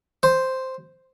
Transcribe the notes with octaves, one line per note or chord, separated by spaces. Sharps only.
C5